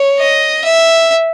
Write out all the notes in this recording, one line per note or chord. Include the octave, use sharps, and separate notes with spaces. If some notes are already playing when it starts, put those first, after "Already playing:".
Already playing: C#5
D#5
E5